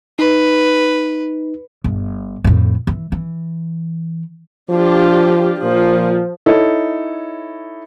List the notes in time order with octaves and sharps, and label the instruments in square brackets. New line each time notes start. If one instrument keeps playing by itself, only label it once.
[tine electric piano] D#4 [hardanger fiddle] B4
[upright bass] G1
F2 A2
E3
E3
[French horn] F3 [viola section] D4 F4 G4
[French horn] A#2 [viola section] F3
[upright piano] D#4 E4 A4 C#5